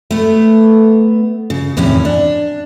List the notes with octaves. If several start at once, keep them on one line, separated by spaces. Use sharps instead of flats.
A3 B3
C#3
E2 A2 C3 D#3 C#4 E4
D4